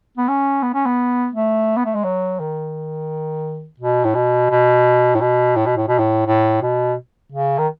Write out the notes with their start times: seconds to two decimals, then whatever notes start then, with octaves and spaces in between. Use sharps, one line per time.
0.18 B3
0.29 C#4
0.63 B3
0.74 C#4
0.86 B3
1.34 A3
1.77 B3
1.85 A3
1.95 G#3
2.04 F#3
2.40 D#3
3.80 B2
4.04 A2
4.14 B2
4.50 B2
5.15 A2
5.21 B2
5.56 A2
5.66 B2
5.76 A2
5.88 B2
5.98 A2
6.26 A2
6.62 B2
7.32 C#3
7.58 D#3